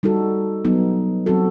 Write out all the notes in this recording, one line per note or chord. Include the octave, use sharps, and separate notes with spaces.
G3 D#4 F#4 A4
F#3 B3 D#4
F#3 C4 F#4 A4